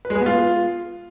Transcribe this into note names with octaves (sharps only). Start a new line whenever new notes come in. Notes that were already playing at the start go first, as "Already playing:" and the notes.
B4
G#3
G#4
B3
F4